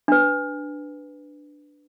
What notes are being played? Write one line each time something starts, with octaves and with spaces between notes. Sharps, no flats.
D4 B4